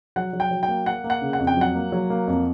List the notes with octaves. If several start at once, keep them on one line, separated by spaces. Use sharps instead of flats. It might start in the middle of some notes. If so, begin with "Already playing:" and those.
F#3 F#5
F#3
G5
F#3
G5
A#3
A#3 F#5
A#3
F#5
C#3
F#5
F2
G5
F#3 F#5
A#3
F#3
A#3
F2